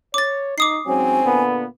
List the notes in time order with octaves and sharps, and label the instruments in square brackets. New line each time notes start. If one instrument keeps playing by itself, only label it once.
[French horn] C#5 [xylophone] D6 A6
[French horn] D#4 [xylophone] D6 D#6 C7
[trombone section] G#2 F#3 C#4 [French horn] C4 [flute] G#5
[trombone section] A#2 D3 B3